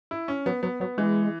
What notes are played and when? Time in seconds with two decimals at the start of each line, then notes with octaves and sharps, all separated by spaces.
0.11 E4
0.28 C#4
0.46 F#3 B3
0.62 F#3 B3
0.80 F#3 B3
0.98 E3 G#3